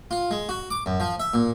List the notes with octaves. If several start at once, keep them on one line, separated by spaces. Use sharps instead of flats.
F4
G#3
F#4
D6
F#2
F3
E5
A#2